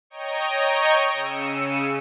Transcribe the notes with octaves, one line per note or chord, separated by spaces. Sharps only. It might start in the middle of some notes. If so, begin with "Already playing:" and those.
C#5 D#5 G5 A#5 C#6
C#3 E6 C#7 D#7